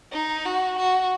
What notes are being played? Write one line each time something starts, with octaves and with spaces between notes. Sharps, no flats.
D#4
F#4
F#4